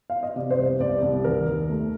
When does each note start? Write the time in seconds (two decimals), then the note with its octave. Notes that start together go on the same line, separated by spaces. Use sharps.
0.10 F5
0.23 D#5
0.36 C3 D5
0.50 C5
0.58 C2
0.65 C5
0.80 C2 D5
1.02 C2
1.24 D#3 A#4
1.46 D#2
1.69 A3